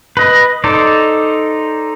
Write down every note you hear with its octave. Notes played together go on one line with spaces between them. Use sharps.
B4 D#5
D#4 A4 C5 D5